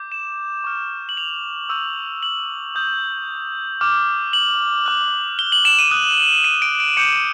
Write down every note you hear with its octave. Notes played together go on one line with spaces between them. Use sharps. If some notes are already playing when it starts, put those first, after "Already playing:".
Already playing: D6 G6
E7
C#6 F6
F#7
F7
C#6 E6 G6
F#7
D#6 G6
D6 F6
F#7
D6 F#6
G7
F#7
E7
D#7
D#6 F#6
D#7
D7
D7
D6 G6 C#7